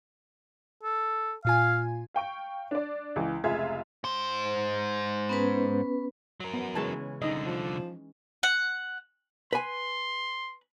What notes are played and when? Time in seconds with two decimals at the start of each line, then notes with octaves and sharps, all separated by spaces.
0.83 A4
1.45 A#2 F4 F5 G#5
2.14 F5 G5 C#6 D7
2.71 D4 D5
3.16 C#2 E3
3.44 F1 C#2 F4 G#4 E5 G#6
4.04 G#2 C5
5.29 B3 C#4 B4
6.40 F#3 A#4
6.54 B3
6.75 C#3 E3 G#3 C#4 A5
7.22 C2 D3 D#4 D#5
7.45 F3
8.43 F#5
9.53 B4 G#5 C6